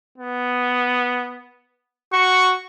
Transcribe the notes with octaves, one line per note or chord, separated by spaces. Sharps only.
B3
F#4 C#6